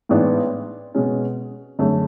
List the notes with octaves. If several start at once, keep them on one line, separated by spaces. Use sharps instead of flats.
A1 G#2 E3 B3 D4
B2 G#3 C#4
F#2 D3 A3 C#4 G#4